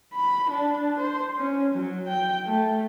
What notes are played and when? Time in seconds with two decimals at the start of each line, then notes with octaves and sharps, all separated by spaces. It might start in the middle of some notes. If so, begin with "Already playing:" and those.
0.14 B5
0.50 D4
0.99 C5
1.38 C#4
1.75 F#3
2.08 G5
2.46 A3